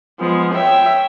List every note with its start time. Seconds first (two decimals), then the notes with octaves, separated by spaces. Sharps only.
0.19 F3 G#3 B3
0.54 C#5 E5 G5